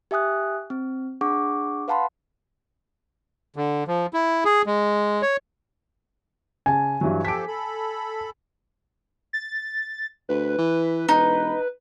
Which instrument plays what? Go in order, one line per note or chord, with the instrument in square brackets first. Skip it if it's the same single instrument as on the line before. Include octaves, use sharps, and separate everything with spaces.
[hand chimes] G4 E5 G#5 D#6 F#6
C4
D4 G#4 F#5 C#6 D6
B4 F5 F#5 A5 B5 C6
[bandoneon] D3
F3
E4
G#4
G#3
C#5
[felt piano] C#3 A5 [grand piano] G#5
[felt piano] G2 E3 F#3
[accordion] F3 G4 A4 [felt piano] B6 D7
[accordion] A4 B5
[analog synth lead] A6
[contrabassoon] D2 [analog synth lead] B4
[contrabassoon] E3
[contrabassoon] E1 [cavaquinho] D#4